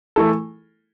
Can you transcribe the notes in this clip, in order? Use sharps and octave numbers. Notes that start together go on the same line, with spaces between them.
E3 A3 E4 A4